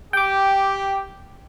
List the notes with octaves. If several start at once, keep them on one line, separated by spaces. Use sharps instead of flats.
G4 G5 D6